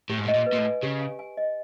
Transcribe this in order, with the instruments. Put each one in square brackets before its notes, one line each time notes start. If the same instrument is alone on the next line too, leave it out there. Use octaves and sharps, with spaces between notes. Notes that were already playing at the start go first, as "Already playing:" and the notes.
[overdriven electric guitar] A2 [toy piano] G4
[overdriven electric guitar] G#2
A2
[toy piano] D#5
[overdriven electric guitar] A#2
[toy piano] B4
[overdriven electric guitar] A#2
A2
[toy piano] G#5
[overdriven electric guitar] C#3 [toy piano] G4
[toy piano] G#5
G#5
D#5